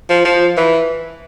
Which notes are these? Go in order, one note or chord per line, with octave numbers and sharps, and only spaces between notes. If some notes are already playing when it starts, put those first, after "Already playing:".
F3
F3
E3